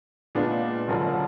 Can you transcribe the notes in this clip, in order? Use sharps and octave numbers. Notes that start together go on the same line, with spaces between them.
A#2 G#3 B3 D4 F4
F#1 F#2 D3 F3